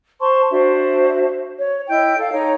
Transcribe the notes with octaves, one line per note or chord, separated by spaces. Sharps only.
C5 A5 C6 C#6
D4 F#4 C5 E5
C#5
E4 D#5 G5 G6
A4 F5
D#4 C#5 A#5